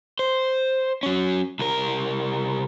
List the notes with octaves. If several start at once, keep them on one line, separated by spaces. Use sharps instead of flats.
C5
F#3 C#4
C2 A#4